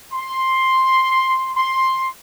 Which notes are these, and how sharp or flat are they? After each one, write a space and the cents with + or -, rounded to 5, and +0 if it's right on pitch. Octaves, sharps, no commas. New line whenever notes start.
C6 +5
C6 +10